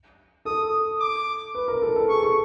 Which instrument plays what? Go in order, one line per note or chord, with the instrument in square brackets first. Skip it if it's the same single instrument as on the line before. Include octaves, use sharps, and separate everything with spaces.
[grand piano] A4 [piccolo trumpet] D#6
[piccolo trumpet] D6
[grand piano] B4
A#4
A4
A4
[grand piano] G#4 [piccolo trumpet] C#6
[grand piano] A4